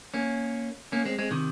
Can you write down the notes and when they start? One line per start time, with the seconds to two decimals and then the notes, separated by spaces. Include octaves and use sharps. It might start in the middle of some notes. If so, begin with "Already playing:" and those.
0.14 A#3 C#4
0.92 A#3 C#4
1.05 G#3 C4
1.19 G#3 C4
1.31 C3 D#3